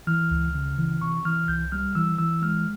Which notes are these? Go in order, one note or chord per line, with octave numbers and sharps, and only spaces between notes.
E3 F6
C#2
C#3
E3
C3 C#6
E3 F6
C2 G6
G3 F6
E3 E6
E3 E6
G#3 F6